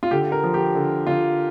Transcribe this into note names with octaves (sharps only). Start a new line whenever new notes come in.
F4
D3 G4
A#4
F3
G4
D3
D3 F4